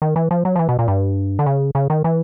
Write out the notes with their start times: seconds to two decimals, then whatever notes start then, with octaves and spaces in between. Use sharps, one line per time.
0.02 D#3
0.16 E3
0.31 F3
0.45 F#3
0.56 F3
0.59 E3
0.69 B2
0.79 A#2
0.88 G2
1.39 D3
1.46 C#3
1.75 C#3
1.90 D#3
2.04 E3